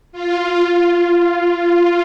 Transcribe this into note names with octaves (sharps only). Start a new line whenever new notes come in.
F4
F4